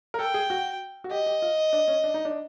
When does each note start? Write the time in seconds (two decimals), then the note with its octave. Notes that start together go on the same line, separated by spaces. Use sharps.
0.14 A#4
0.19 A4 G5
0.34 G#4
0.50 F#4
1.04 F#4
1.11 G4 D#5
1.26 G4
1.42 F4
1.73 D4
1.88 C#4
2.04 D4
2.14 D#4
2.25 D4